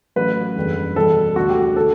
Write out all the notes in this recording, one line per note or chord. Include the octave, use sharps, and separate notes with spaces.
A1 A2 F#3 B4
F#1 E2 D3 G3
E2 B2 G3 A4
E1 D2 D3 F#4
G4
G4
D3 A4